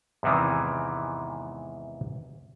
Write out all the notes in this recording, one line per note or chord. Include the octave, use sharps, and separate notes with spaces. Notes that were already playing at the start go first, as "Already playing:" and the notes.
E2 G#2 C3 D#3 E3